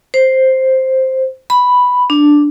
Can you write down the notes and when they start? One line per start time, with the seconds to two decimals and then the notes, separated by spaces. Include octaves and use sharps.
0.14 C5
1.50 B5
2.10 D4